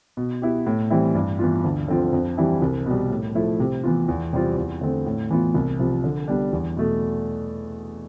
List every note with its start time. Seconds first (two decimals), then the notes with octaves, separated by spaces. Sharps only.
0.17 B2
0.42 B3 E4 G4
0.67 A2
0.90 E3 G3 C4 E4
1.15 G2
1.39 E3 B3 F4
1.64 D2
1.88 D3 F3 C4 F4
2.13 F2
2.37 E3 G3 C4 E4
2.62 C2
2.86 B2 G3
3.10 A2
3.35 F3 A3 E4
3.60 C3
3.84 E3 B3 F4
4.08 E2
4.33 C3 G3 C4 F4
4.57 E2
4.81 D3 A3 C4
5.06 A2
5.30 E3 B3 F4
5.54 C2
5.79 C3 F3
6.04 D3
6.28 G3 B3 D4
6.53 E2
6.77 B2 A3